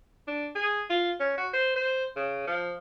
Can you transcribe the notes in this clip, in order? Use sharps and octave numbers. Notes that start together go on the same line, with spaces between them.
D4
G#4
F4
C#4
F#4
C5
C5
C#3
F3